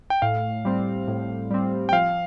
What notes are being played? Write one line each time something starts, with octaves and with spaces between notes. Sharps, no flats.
G5
A2 F5
G3 C4
A2
G3 C4
G5
F3 F5